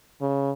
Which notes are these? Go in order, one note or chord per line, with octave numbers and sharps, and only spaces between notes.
C#3